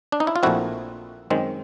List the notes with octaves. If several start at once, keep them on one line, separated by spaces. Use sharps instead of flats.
D4
D#4
E4
F4
A#1 A#2 F3 A3 C4 E4 F#4
F#2 D#3 G#3 C4